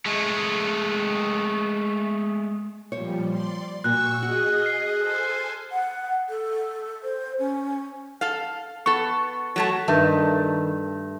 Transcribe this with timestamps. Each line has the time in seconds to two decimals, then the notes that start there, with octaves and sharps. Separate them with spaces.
0.06 G#3 A3
2.92 A#2 F3 G3 C5 C#5
3.28 D5 C6
3.84 A#2 F#4 C#6 E6 F#6
4.22 F#4 G#4 D#5
4.62 F6 C7
4.96 A4 C5 G#5
5.72 F#5
6.29 A4
7.03 C5
7.39 C#4
8.21 A4 F5
8.86 B3 A4 C#6
9.56 F#3 A3 A5
9.88 G2 D#3 A3